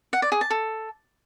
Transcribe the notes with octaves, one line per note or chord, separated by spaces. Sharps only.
F#5
D5
G#4
A5
A4